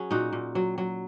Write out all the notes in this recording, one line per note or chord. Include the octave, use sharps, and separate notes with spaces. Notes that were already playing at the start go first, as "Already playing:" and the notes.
Already playing: F#3 C#4 G#4
A#2 D#4 F#4
A#2
F#3
F#3